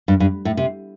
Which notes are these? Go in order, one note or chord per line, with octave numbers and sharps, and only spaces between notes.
G2
G2
A2
C3